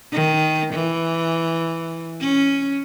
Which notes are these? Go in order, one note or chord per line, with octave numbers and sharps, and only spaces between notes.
D#3
E3
C#4